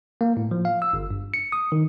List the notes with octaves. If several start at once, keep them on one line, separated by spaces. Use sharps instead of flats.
A#3
A2
F3
F5
E6
G1
G2
C#7
D#6
D#3